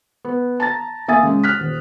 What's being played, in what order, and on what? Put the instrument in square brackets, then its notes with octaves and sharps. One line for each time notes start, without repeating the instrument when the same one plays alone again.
[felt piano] B3
A5 A#5 A6
A#3 E5 G#5 D#6 A6
C#3 G#3
F6 F#6 B6
D#1